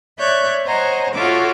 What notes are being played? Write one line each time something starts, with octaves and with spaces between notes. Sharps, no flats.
C#5 D5 E5 C#6 F#6 G6
C5 C#5 D#5 F#5 G#5 A#5
F4 F#4 A4 C#5 E5 D6